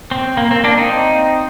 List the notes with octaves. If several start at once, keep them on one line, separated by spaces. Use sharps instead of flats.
C4
A#3
C4
A#3 D4
C4 D#4